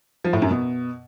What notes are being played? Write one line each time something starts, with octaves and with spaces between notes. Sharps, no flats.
F3
A2
F#2
B2